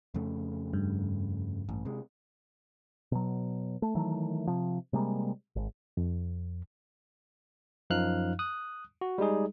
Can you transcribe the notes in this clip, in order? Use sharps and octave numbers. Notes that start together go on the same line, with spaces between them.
F2 C#3 A3
G2
A1
C3 G#3
B2 F#3
A3
D#3 E3 F#3 A3
C3 F3
C3 G3 G#3 A#3
G#1
F2
F#2 F3 D#4 F5 F6 F#6
D#6 F#6
F#4
G3 G#3 D#4 G#4